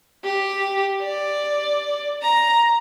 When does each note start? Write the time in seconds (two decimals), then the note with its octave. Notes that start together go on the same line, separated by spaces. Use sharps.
0.24 G4
1.03 D5
2.21 A#5